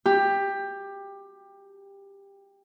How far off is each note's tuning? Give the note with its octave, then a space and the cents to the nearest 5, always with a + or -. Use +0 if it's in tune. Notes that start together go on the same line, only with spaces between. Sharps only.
G4 +15